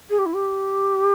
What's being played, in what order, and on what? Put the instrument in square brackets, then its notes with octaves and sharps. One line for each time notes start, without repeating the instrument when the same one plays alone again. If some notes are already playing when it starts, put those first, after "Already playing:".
[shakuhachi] G#4
G4
E4
G4